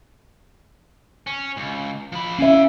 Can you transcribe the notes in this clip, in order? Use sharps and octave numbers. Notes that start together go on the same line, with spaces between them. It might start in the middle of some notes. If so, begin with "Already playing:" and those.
C#4
C#2
F3 B5
C#4 E5 F5 G#5